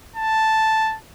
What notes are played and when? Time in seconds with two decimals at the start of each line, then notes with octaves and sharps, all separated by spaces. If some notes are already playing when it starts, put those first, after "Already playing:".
0.16 A5